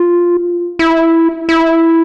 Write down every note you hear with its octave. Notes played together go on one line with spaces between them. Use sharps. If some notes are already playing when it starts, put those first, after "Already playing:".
Already playing: F4
E4
E4